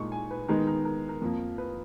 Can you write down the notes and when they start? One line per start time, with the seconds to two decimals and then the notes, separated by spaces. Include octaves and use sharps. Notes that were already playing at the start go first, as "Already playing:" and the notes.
Already playing: A#2 G#3 D#4 C#6
0.12 G#5
0.31 B4
0.48 D#3 G#3 B3 D#4 A#4
0.67 A#4
0.85 A#4
1.09 A#4
1.22 F2 F3 A#3
1.58 B4